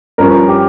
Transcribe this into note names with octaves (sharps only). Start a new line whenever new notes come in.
G2 F3 C#4 A#4
G4